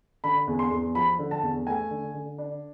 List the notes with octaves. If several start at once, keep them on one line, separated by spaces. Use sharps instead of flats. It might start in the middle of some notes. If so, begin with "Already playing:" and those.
D3 B5
E2
C6
E2
F3 B5
D3
A5
E2
A3 G#5
D3
D3
D4